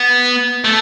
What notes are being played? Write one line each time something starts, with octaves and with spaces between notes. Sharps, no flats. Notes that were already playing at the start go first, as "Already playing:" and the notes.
Already playing: B3
A3